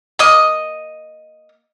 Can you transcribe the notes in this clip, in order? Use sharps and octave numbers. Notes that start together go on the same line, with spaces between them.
A#3 D#5